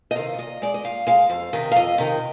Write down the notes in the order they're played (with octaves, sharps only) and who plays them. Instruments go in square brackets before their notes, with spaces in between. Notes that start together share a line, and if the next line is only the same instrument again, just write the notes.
[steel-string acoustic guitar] D#5
C3 D#3 F5
A#2 D#5
G#3 D5
D#5
A#2 F5
G#3 F5
F2
C3 D#3
F5
F2 D#5
C3 D#3